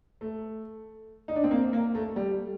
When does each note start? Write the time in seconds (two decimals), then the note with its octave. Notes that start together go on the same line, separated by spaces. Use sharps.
0.21 A3
1.28 D#4
1.36 D4
1.44 C4
1.51 A#3
1.73 A#3
1.95 A3
2.16 G3